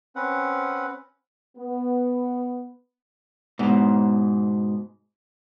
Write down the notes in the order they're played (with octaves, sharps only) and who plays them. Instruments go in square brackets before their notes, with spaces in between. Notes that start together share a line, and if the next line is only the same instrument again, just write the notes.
[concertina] C4 C#4 B4 F#5
[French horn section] B3
[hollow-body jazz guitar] G#2 B2